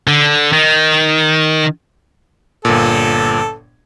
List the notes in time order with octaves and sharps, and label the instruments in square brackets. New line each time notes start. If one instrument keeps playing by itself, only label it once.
[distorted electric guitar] D3
D#3
[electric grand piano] G1 A#2 [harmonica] A4